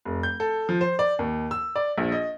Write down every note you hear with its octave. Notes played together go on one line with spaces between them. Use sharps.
F1
G6
A4
F3
C5
D5
D#2
E6
D5
A#1
D#5